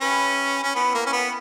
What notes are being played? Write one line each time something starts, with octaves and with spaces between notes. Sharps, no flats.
C#4 E4 G4 B4
C#4
B3 E4 G4 B4
A#3
C#4
B3